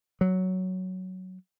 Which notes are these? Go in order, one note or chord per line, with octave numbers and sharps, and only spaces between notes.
F#3